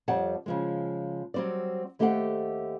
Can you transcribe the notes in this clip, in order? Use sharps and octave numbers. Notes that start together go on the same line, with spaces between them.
F2 G3 G4 C#5 F#5 A5
C#3 F3 G#3
F#3 G3 C4 C5 D5
D#2 A3 G4 A4 C5 F#5